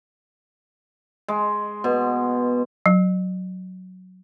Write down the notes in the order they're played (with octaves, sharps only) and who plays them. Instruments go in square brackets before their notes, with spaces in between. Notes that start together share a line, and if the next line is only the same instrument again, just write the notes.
[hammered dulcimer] G#3
B2
[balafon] F#3